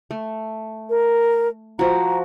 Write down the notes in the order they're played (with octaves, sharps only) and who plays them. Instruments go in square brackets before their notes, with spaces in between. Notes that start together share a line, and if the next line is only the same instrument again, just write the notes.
[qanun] A3
[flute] A#4
[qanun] F3 F#4 [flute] A#5